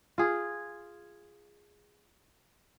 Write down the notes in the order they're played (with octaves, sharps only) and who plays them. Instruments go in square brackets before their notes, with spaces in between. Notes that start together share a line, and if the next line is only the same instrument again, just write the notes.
[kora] F4 G#4